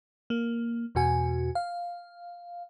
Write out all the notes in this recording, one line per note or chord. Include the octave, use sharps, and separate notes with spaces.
A#3
E2 B2 F#4 G#5
F5